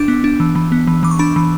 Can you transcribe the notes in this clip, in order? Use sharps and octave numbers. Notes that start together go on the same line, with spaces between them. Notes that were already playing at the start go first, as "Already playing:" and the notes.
Already playing: D4 D6
B3
D4
E3
E3
B3
E3
E3 D6
C#6
D4 B5
E3